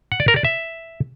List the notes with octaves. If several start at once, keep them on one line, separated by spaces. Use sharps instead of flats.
F#5
D5
A#4
D5
E5